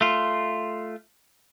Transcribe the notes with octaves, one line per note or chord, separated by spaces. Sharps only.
A3 F4